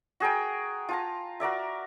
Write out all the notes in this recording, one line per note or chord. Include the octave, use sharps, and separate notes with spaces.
F#4 G#4 A#4 G5
F4 A5 A#5
F#4 A#4 D5 E5